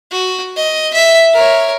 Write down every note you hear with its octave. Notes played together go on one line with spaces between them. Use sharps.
F#4
D#5
E5
A#4 C#5